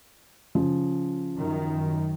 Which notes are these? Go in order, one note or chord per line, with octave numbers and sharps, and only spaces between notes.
C#3 F3
F#2 D#3